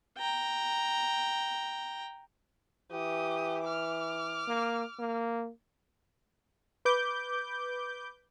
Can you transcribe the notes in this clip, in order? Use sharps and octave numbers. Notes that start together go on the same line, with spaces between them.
G5 A#5
E3 G4 D#6
D6 F6
A#3
A#3
B4 D6 G6